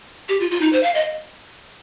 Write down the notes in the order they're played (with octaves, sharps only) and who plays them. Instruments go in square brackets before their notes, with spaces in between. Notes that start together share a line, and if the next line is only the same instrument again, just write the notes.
[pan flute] G4
F4
F4
D#4
C5
F5
D#5